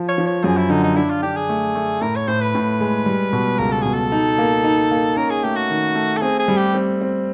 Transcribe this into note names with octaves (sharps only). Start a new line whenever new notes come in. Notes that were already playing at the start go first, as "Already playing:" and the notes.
Already playing: F3
C#5
F3
C#5
F#2 G#4
E4
D3 D#4
D#4
D4 E4
F4
D4 G4
G#4
A3
A3
A2 A#4
C#5
A2 C5
B4
A2
G#3
G3
B2
C#2 A#4
A4
B2 G#4
A4
D#4
A#3
D#4
A#3
C#4 A#4
G#4
A3 G4
F#4
D#3
A3
A4
C4 G#4
G#4
G3
G4
C4
C4